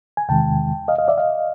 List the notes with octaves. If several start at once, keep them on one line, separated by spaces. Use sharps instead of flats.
G#5
E2 C3 D#3 G#3 G5 A5
D#5 F5
D#5 F5
D5 E5
D#5 F5